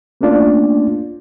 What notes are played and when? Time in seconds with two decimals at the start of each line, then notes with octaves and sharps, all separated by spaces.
0.21 A3 A#3 C#4 D4 F4 D5